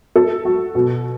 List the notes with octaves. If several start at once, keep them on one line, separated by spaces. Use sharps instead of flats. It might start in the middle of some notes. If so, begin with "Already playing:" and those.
A4
F#4
B2